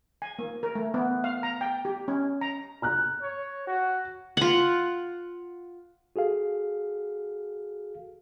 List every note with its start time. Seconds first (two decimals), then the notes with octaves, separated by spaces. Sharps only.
0.22 G#5
0.39 A#3
0.63 A#4
0.75 A3
0.94 B3
1.24 F5
1.43 A#5
1.61 G5
1.85 G4
2.08 C#4
2.41 A#5
2.82 A#5 F6 F#6
3.22 C#5
3.67 F#4
4.37 F4 F#5
6.16 F#4 G#4 A4 F5